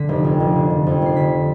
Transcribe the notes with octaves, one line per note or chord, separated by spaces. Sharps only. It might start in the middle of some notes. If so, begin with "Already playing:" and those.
Already playing: D3 B6
F1
F2
F1
D3
F1
F2
F1 C7
D3 B6